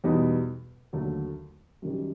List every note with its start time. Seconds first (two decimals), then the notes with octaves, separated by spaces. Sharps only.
0.04 E2 B2 G3 B3 D#4
0.93 D#2 D3 F#3 A3
1.82 F#2 D#3 G3